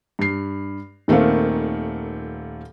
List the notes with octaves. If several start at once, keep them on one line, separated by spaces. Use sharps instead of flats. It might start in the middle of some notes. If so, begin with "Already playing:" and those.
G2 C7
D#1 D#3 A3 A#3 C4 F5